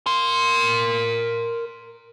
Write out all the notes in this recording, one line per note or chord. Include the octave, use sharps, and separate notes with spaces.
A#4 C6